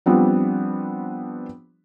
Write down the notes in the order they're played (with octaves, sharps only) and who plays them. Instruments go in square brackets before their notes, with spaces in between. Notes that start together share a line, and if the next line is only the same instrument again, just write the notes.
[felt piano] F3 G3 B3 C4 D4